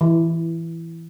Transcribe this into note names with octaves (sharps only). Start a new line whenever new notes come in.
E3